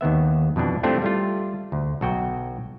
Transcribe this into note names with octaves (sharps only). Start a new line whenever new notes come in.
D#2 D#3 B3 E5
F2 B2 E3 D4
A3 C4 D4 E4 F4 G4
G3 A3 F4
D2
B1 F#4 G5